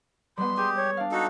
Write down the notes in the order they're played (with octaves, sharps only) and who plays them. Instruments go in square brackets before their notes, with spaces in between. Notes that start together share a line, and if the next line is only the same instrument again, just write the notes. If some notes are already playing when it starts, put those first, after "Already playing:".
[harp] G3 G#3 B3 [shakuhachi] C6
[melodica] G4 [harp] G#4
[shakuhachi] C#5
[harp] D4 F5
[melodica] D#4 A4 [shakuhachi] F#4